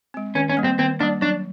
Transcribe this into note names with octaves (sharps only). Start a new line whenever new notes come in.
G#3 C4
D#3 C#4
C#4
G3 A#3
C4
D#3 C4
G3 A#3 D4
F#3 D4